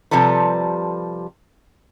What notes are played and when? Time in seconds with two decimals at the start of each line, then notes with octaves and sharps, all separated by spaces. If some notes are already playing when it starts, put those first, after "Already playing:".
0.11 C3 F3 G3 A4 B4